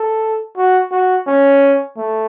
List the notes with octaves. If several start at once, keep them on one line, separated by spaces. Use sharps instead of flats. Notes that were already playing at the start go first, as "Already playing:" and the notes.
Already playing: A4
F#4
F#4
C#4
A3